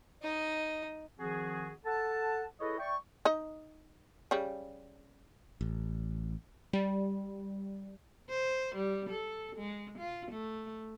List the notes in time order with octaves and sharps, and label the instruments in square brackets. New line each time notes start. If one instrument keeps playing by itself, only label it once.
[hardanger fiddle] D#4 D#5
[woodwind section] D#3 F3 C4 F#4 G#4
A4 F#5 A5
E4 G#4 A4 B4 C#5 D#5
D5 E5 G5 C#6
[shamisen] D#4 D#5
C#3 G3
[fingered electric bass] A1
[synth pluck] G3
[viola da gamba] C5
G3
A4
G#3
F4
A3